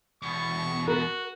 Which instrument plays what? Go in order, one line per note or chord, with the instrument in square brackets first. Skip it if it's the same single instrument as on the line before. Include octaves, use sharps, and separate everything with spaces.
[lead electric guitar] E2 B2 [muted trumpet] C#6
[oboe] F#4 [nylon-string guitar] A#4